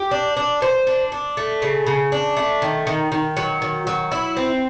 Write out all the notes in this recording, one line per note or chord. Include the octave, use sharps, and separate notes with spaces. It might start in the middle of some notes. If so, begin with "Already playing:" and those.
Already playing: G4
D4
D4
C5
D4
D4
A3
C#3
C#3
D4
A3
D#3
D#3
D#3
F#3
D#3
F#3
E4
C4